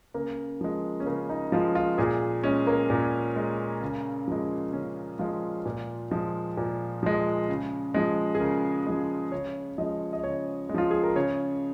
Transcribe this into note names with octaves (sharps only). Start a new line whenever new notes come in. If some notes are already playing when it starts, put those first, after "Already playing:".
C#3 A#3
F3 G#3
C#4
C#3 A#3
D#4
F3 G#3 F4
F4
A#2 G#4
G#3 C#4
A#3
A#2
G#3
C#3
F3 G#3
C#3 C#4
F3 G#3 F4
A#2
F3 G#3
A#2
F3 G#3
C#3
F3 G#3
G#4
C#3 A#4
F3 G#3
C#3 C#5
F3 G#3 D#5
D#5
C#3 C#5
G#3
F3 F4
G#4
A#4
C#3 C#5